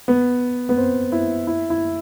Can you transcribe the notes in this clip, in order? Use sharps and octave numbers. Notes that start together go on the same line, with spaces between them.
B3
B3
C4
E4
E4
E4